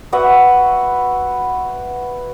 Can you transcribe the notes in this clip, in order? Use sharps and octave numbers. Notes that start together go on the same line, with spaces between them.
F#4 B4 E5 F#5